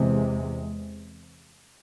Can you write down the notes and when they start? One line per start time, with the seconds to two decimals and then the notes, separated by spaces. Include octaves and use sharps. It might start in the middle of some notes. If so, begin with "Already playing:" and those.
Already playing: E2 C3 G#3